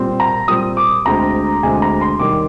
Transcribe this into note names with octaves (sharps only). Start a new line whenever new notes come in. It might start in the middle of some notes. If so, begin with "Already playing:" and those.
Already playing: A#2 G3 C4
A#5
A#2 G3 C4 D#6
D6
D2 D3 G#3 C4 A#5
D2 D3 G#3 C4 G#5
A#5
C6
D#2 D#3 G3 D6